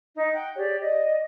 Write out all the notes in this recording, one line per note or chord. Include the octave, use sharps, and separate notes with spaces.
D#4
F#5 G5
G4 G#4 C#5 D5
D5 D#5